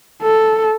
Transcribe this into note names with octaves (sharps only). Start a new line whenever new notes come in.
A4